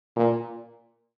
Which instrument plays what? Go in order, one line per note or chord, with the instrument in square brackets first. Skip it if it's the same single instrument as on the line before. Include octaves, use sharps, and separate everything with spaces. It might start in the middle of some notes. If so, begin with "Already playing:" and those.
[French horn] A#2